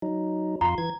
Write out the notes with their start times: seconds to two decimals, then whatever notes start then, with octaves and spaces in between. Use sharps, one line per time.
0.02 F#3 D#4
0.61 F2 F4 A#5 C6
0.78 E3 G#6